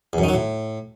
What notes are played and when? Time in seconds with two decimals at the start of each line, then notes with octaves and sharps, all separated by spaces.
0.13 E2
0.18 F#2
0.23 D#3
0.29 F#3
0.34 A2